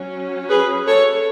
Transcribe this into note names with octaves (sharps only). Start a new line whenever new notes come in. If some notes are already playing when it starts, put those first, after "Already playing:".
Already playing: F#3 C#4
G#4 B4
A4 C#5